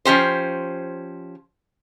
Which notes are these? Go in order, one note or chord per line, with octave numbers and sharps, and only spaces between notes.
F3 C#4 G4 C5